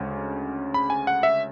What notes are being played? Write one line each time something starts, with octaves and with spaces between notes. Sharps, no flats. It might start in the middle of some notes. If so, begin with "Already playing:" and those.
Already playing: D2 C#3 G#3 C#4
B5
G#5
F#5
E5